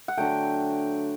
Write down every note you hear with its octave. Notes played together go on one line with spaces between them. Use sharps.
F#5
D3 F#3 A3 G5